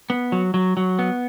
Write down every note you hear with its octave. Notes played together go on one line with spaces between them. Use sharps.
B3
F#3
F#3
F#3
B3